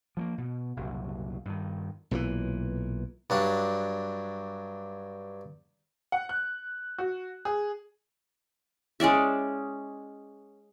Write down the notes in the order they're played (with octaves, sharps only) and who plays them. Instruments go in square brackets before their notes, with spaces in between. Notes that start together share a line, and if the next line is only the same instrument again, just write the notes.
[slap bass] F3 A3 A#3
B2
F#1 C2 A#2 F#3
G2 D#3
B1 A#2 D3 E3
[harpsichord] G2 F#3 D4
[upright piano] F#5
F#6
F#4
G#4
[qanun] G#3 C#4 D5 E5